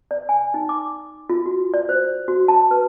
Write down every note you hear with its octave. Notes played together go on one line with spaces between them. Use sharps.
D5
G#5
D#4
D6
F4
F#4
D5
C5
F#4
A5
B4